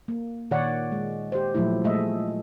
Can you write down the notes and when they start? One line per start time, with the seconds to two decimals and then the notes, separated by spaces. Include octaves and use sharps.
0.08 A#3
0.51 A#2 D#3 C#5 D5 F#5
0.92 G#3
1.32 G4 C5
1.55 A#2 F3 F#3 A3 E4
1.84 A#2 G#3 A3 D#5 E5